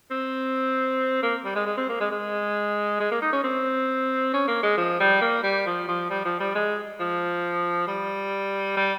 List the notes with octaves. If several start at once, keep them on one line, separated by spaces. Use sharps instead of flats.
C4
A#3
G3
G#3
G#3
C4
A#3
G#3
G#3
G#3
A#3
D#4
C#4
C4
C#4
A#3
G#3
F3
G3
A#3
G3
F3
F3
G3
F3
G3
G#3
F3
G3
G3